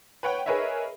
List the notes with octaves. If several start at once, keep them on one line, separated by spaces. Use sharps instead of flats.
B4 C#5 F#5 G5
G#4 A#4 B4 C#5 D#5 E5